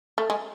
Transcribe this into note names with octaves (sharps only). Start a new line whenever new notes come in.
A3
G#3